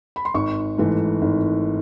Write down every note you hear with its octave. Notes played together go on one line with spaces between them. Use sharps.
B5
C6
G#1 C#6
G#2 E3 A3
G#1